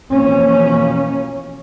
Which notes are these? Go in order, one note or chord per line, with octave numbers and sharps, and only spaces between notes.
B2 E3 F3 A#3 C#4